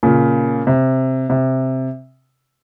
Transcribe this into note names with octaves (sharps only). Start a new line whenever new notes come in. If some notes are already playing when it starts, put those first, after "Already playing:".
A#2 C#3
C3
C3